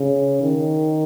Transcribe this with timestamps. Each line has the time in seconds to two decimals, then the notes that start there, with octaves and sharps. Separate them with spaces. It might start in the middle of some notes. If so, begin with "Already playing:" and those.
Already playing: C#3
0.42 D#3